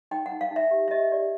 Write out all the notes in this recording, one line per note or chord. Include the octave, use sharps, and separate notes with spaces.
D#4 G5
F#5
D#4
F5
D#4
E5
G4
E5
G4 D#5
G4 D5